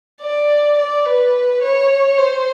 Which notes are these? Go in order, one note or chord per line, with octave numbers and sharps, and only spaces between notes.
D5
D5
B4
C#5
C5